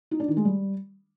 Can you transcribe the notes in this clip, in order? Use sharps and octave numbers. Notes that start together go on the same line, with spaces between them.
D#4
D4
D#3
G#3
G3